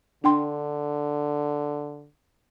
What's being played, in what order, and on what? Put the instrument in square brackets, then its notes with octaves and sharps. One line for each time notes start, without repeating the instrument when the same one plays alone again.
[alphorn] D3 [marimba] D4 G5 C6